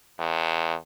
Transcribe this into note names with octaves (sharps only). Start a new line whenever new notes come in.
E2